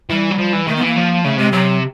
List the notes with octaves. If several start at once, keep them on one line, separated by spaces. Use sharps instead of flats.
E3 G3
F#3
F3
E3
D#3 A3
B3
E3
A#3
F3
C#3 A3
C3 G#3
C3 F#3